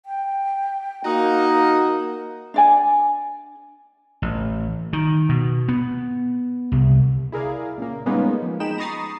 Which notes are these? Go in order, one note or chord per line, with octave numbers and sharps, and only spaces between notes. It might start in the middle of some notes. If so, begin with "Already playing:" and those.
G5
A#3 D#4 F#4
D4 D5 G#5
A1
D#3
B2
B3
C2
E4 G#4 A#4 D5 F5
A#2 C#3 A#3
G3 G#3 A#3 B3 C#4 D#4
F3
G#3 D#4 G5 B5 E7
A#5 B5 C#6 D#6 A6 C7